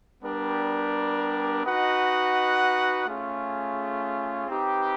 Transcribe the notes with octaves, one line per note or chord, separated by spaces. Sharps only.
G3 B3 D4 G4 A#4
D#4 F#4 B4 D#5 F#5
A3 C#4 F4 G#4
C4 D#4 G4 B4